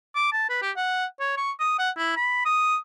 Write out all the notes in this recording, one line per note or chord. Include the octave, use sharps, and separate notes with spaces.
D6
A5
B4
G4
F#5
C#5
C#6
D#6
F#5
E4
B5
D#6